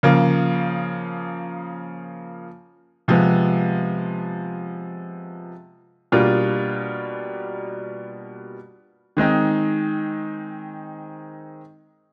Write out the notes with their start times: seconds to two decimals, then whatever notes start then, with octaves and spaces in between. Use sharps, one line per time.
0.03 C#3 F3 A#3
3.08 C3 F3 G#3 B3
6.12 B2 G3 A#3 D4 F4
9.17 D#3 G#3 C4 D#4